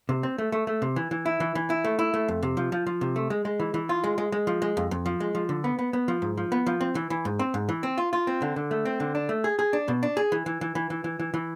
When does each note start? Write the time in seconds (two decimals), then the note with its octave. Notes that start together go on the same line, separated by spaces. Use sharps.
0.09 C3
0.23 C4
0.38 A3
0.52 A3
0.67 A3
0.82 C3
0.96 E3
1.11 E3
1.26 E4
1.40 E3
1.55 E3
1.70 E4
1.84 A3
1.99 E4
2.14 A3
2.28 F2
2.43 C3
2.57 F3
2.72 F3
2.87 F3
3.01 C3
3.16 A3
3.30 G#3
3.45 G#3
3.60 E3
3.74 E3
3.89 F4
4.04 G#3
4.18 G#3
4.32 G#3
4.47 F3
4.62 G#3
4.77 F2
4.91 F2
5.06 F3
5.20 G#3
5.35 F3
5.49 D3
5.64 B3
5.79 B3
5.93 B3
6.08 F3
6.22 G#2
6.37 F3
6.52 B3
6.67 F3
6.81 C4
6.95 E3
7.10 E3
7.25 G#2
7.39 C4
7.54 G#2
7.69 E3
7.83 C4
7.98 F4
8.13 F4
8.27 C4
8.42 D3
8.56 D3
8.71 A3
8.85 C4
9.00 D3
9.15 D4
9.29 A3
9.44 G#4
9.59 G#4
9.73 D4
9.88 B2
10.03 D4
10.17 G#4
10.32 E3
10.46 E3
10.61 E3
10.75 E3
10.90 E3
11.04 E3
11.20 E3
11.34 E3